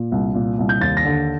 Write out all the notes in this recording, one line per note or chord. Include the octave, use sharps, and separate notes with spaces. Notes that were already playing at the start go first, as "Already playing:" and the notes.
Already playing: A#2
C2
A#2
C2
G6
D#2 A6
A#6
D3